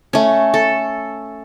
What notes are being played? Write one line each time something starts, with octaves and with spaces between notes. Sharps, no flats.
A3 C#4
A4